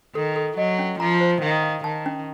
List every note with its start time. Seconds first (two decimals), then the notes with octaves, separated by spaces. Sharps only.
0.15 D#3 A4
0.36 A4
0.57 F#3 D#5
0.79 C#4
1.00 F3 A#5
1.21 C5
1.42 D#3 F5
1.63 F5
1.84 D#3 A5
2.06 C#4